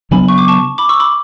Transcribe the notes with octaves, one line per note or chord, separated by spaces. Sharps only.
C#3 F#3 B3 D4 G#5 B5
C#6
D6
A5 C#6
B5 D6
C#6 E6
B5 D6